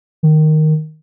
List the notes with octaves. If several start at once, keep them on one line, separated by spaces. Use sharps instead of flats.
D#3